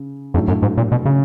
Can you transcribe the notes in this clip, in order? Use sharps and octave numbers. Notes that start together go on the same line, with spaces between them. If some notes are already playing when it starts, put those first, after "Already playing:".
Already playing: C#3
F2 A2 F#3 A3 D4
F#2
G#2
A#2
B2
C#3